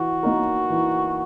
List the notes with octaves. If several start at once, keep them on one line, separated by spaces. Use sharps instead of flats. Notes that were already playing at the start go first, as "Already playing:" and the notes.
Already playing: E3 F#4
A#3 D#4 A#4
E3